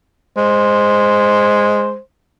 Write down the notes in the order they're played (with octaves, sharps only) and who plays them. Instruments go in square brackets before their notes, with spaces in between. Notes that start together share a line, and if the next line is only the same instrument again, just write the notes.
[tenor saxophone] G#3 [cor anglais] C5